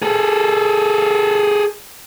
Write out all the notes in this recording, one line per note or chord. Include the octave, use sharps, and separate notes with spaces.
G#4 A4